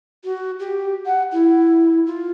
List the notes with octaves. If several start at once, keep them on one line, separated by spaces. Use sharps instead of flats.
F#4
G4
F#5
E4
F4